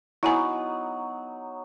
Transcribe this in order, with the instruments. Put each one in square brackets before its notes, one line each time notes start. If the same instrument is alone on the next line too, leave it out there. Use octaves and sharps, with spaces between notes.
[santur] F#3 B3 D#4 [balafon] E4 F#5 G#5